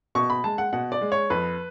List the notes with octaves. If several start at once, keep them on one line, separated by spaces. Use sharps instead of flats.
B2 C#6
B5
G#3 A5
F#5
B2 F#5
D5
G#3
C#5
F2 B4